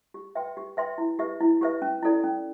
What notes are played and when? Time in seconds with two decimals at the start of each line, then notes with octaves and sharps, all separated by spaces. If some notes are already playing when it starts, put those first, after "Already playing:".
0.14 G4
0.35 B4 E5 G5 C6
0.57 G4
0.77 B4 E5 G5 C6
0.98 E4
1.19 G4 B4 E5
1.41 E4
1.61 G4 B4 E5
1.82 C#4
2.03 E4 A4 D5
2.24 C#4